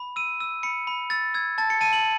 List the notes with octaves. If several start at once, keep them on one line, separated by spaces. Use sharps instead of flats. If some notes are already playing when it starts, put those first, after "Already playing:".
Already playing: B5
E6 D#7
E6
B5 C#7
B5
E6 A6
E6 G#6
A5 A6
C#7
A5 D#7
F#7